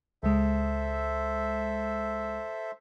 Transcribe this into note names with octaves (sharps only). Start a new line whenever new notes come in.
C#2 G#3 A4 C5 E5